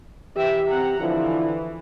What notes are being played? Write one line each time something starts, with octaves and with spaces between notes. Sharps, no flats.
E3 G4 E5 G5
C4 F#5 A#5
D3 E3 F3 E4